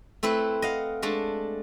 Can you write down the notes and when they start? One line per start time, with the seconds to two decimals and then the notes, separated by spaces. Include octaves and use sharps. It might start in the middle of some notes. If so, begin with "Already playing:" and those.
0.23 A3 C4 E4 B4 C5
0.62 D#5 F5 F#5
1.02 G#3 A3 D4